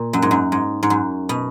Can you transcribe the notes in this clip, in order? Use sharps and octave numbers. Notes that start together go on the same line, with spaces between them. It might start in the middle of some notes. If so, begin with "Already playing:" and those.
Already playing: A#2
F#2
G#2
F#2
G#2
G#2
F#2
B2